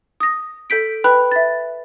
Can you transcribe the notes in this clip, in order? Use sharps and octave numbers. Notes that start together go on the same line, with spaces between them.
D#6 A#6
A4 G6 B6 D7
B4 G5 B5 F#6
E5 A6